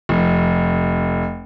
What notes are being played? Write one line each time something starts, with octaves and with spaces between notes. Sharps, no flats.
F1